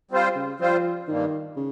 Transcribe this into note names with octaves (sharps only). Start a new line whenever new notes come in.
G3 C4 F4 C5
C#3
F3 G3 C4 F4 C5
G2 D#3 G3 A#3
C#3